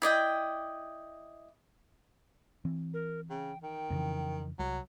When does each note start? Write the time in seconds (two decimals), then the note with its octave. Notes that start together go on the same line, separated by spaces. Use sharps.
0.02 E4 D5 D#5 G5
2.65 E3 C4
2.94 A#4
3.30 C#3 G5
3.63 D#3 G5
3.90 F2 C#3 E3
4.59 C2 F#3